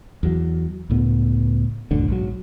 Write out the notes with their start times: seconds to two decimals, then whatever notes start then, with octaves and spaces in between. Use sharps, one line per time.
0.23 E2 F#3
0.90 C#2 A2 B3
1.91 C#2 F#2 A2 D3
2.08 B1 G#2 F#3